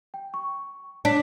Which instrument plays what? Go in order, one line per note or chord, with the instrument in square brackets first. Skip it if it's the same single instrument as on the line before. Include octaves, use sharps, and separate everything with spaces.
[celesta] G5
C#6
[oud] D4 [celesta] C#5 B6